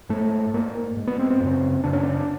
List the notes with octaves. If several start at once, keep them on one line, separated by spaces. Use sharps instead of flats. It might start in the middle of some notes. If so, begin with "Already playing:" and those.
G#2 A3
G#2 A#3
G#2
B3
C4
C4
F#2 C#3
F#2 C#3 D4
C#4
D4